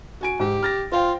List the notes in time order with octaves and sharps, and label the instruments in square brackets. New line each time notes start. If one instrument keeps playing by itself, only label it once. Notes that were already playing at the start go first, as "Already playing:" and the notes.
[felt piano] F#4 G#5 D7
[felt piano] G#2 [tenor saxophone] G4
[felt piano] F6 A6 A#6
[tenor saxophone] F4 [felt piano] C5 F5 G5